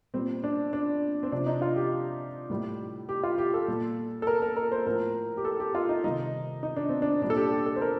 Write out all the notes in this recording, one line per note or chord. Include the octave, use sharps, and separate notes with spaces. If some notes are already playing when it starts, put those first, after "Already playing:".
A#2 G3 C4
D4
D4
C4
C3 F3 D4
D#4
F4
G4
A2 G3
G4
F4
G4
A4
A#2 G3
A4
A#4
A#4
A#4
C5
A2 F3 A#4
G4
A4
G4
F4
D#4
C3 D#3 G3 D#4
D#4
D4
C4
D4
A#2 G3 D4
A4
G4
G4
A4
C5
A#4